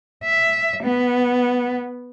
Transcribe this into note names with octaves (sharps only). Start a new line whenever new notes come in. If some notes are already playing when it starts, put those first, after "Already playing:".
E5
B3